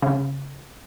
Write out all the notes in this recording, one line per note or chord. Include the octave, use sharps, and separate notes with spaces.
C#3